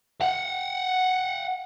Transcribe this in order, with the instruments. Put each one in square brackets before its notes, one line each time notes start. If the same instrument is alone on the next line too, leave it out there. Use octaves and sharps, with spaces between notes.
[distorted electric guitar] F5 F#5